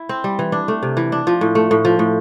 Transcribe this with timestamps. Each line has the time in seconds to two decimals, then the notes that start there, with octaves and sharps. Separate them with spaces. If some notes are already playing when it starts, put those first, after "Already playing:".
Already playing: E4
0.09 C4
0.24 G3
0.39 E3
0.52 D4
0.68 A3
0.83 C3
0.97 E3
1.12 D4
1.27 F3
1.41 A2
1.55 A3
1.71 A2
1.85 F3
1.99 A2